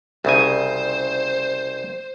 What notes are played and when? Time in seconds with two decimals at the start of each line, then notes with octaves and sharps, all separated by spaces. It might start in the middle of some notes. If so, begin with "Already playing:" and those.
0.25 C2 C#3 C5 G#5